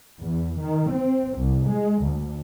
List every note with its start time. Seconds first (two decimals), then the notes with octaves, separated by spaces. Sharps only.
0.21 E2
0.59 D#3
0.91 C4
1.37 C2
1.67 G#3
2.03 D2